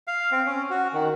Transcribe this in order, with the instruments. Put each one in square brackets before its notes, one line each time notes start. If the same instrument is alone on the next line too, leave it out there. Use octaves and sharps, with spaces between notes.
[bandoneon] F5
C4
C#4
F#4
D#3